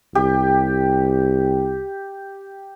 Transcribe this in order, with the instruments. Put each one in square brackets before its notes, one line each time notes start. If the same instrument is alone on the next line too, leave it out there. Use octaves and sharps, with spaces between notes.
[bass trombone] C2 [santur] G4